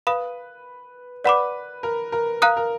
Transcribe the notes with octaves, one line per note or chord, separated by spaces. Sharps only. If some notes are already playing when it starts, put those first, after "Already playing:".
B4 F5 B5 D#6
B4 D5 F#5 B5 D6
A#4
A#4
A#4 F5 A#5 D#6 F#6
A#4